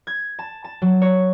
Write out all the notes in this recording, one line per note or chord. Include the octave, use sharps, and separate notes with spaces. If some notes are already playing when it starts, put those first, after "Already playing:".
G#6
A5
A5
F#3
C#5